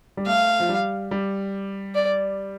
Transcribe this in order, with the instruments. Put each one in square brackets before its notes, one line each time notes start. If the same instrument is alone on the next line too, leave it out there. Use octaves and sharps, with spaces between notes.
[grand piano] G3
[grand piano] A3 [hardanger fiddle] F5
[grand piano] F3
G3
G3
[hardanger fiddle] D5